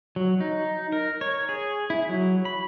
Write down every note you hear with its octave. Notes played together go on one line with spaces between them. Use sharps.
F#3
D#4
A#4
C#5
G#4
E4
F#3
B5